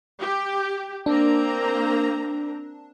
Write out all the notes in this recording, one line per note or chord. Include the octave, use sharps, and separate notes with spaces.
G4
A#3 C4 D4 A#5